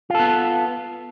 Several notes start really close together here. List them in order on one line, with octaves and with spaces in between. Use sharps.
F4 A4 B3